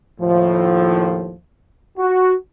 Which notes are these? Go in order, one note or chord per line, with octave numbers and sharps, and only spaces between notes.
D#2 A2 F3
F#4